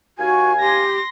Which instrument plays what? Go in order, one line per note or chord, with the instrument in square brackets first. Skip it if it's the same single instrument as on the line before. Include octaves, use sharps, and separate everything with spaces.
[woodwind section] D#2 F5 G#5 [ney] F#4
[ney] G4 [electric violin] C6 A#6